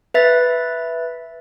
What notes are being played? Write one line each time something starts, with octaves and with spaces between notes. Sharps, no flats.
B4 E5 A6